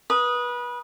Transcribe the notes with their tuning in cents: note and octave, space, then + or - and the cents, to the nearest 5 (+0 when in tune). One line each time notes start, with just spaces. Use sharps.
B4 -25 D#6 +0